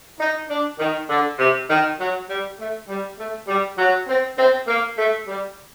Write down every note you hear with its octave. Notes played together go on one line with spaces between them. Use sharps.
D#4
D4
D#3
D3
C3
D#3
F#3
G3
A3
G3
A3
G3
F#3
C4
C4
A#3
A3
G3